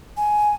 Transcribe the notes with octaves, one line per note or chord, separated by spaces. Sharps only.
G#5